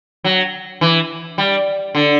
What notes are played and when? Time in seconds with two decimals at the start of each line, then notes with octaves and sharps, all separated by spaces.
0.24 F#3
0.81 E3
1.38 G3
1.95 D3